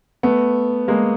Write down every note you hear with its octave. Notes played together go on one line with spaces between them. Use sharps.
A3 B3
G#3 A#3